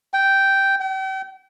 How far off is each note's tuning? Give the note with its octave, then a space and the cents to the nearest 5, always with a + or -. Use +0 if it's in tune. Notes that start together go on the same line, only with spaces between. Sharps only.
G5 -5
G5 -40